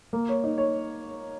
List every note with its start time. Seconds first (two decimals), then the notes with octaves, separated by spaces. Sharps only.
0.13 A#3
0.29 C#5
0.44 D#4
0.58 C#5